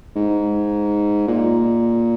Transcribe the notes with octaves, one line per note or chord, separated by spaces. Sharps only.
G#2
A#2